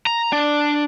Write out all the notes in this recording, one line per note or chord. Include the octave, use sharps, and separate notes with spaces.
A#5
D4